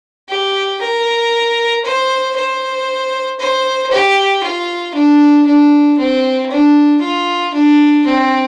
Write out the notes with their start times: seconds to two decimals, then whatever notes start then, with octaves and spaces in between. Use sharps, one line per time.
0.28 G4
0.81 A#4
1.84 C5
2.36 C5
3.39 C5
3.91 G4
4.43 F4
4.94 D4
5.46 D4
5.98 C4
6.50 D4
7.01 F4
7.54 D4
8.05 C4